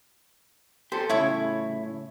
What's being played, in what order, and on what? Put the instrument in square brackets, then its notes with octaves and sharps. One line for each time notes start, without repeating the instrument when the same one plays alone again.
[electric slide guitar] G4 A4 [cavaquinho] C5
[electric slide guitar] A2 C#3 [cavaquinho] E4 C#5 C#6